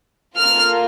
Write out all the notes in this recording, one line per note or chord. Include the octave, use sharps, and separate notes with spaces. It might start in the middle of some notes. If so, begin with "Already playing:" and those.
A#3 F4 A4 F6